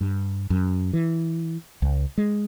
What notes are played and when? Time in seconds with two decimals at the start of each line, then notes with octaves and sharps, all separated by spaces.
0.01 G2
0.50 F#2
0.93 E3
1.82 C#2
2.18 G#3